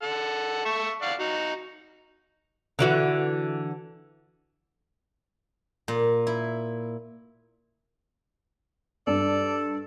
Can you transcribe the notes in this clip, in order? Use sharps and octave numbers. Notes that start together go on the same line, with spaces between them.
A4 F#5
A4 E5 C#6
D5 F5 F#5
D#4 F#4
D3 E3 F#4
A#2
E4
G2 A4 D5